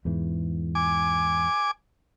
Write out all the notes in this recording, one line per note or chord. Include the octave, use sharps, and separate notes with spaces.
E2 G#2 E3
G#5 D6